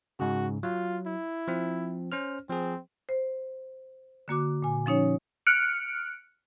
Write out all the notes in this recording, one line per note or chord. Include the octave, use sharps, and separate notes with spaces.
G#2 C#3 F#4
F#3 F4
E4
F3 C4
C#4 C5 F6
F3 C4 G#4
C5
D3 A#3 F#4 D6
A#2 G#5
F3 C#4 D#4 C#5
F6 F#6 C#7 D7